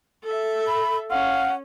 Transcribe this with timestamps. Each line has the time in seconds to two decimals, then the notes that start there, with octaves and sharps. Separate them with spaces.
0.23 A4 E5
0.67 B5
1.11 C#4 F5 F#5